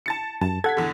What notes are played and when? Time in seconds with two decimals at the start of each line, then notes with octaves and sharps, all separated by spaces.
0.06 A5 A6 C#7
0.41 F#2 A5
0.64 A4 F#5 G#6 B6
0.77 E2 D3